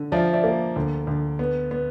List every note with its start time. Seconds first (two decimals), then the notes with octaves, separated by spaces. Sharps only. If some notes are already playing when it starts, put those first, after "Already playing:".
Already playing: D3
0.12 F3 D5 E5
0.33 D5 E5
0.44 A#3
0.76 D2
1.07 D2
1.39 B3
1.71 B3